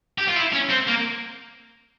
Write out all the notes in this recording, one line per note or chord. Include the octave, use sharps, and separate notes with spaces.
G4
F4
E4
C#4
C4
A#3